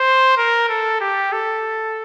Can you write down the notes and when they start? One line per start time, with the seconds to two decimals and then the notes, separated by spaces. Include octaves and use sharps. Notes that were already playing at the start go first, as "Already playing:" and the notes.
Already playing: C5
0.37 A#4
0.69 A4
1.01 G4
1.32 A4